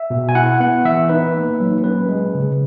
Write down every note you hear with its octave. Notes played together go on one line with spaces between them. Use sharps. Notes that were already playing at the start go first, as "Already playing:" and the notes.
Already playing: E5
B2
G#5
E4 F#5
B3 F#5
E3 E5
D#4 B4
A#3
F#3
C#4 B4
G#3
C#3